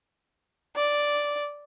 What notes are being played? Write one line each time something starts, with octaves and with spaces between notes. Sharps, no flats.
D5